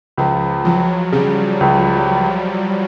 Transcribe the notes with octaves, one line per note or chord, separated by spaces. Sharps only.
C#2 F3
F3 F#3
C#3 G3
C#2